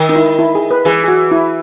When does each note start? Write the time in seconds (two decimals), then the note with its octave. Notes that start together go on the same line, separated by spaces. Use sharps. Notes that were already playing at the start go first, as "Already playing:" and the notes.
Already playing: D#3
0.09 D#4
0.16 E4
0.39 E4
0.55 G#4
0.71 B4
0.85 E3 G#4
1.04 G#4
1.08 F#4
1.31 E4